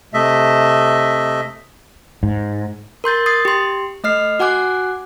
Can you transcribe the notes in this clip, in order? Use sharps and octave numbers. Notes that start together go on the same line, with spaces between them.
C3 A3 D#5 E5
G#2
A#4 C6 G6 A6
D#6 G#6 A6 C7
G4 C6
A3 D#5 F6 C7
F#4 F#5 G#5 D6 F#6